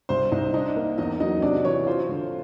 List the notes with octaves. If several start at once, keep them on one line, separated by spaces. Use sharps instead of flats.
C2 C5
C2 D#4 D#5
D4 D#4 D#5
A#3
E2 D#4 D#5
F#3 D#4 D#5
C3 D4 D5
E3 C#5
F4 C5
D3